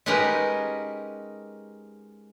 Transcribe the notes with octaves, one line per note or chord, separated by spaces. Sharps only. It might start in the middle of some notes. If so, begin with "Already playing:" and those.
G#3 C#4 D#4 G4 A#4 B4